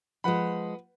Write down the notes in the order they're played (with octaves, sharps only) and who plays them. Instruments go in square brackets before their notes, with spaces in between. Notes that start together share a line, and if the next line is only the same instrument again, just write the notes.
[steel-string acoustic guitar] F3 G#3 [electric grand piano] B4 F#5 B5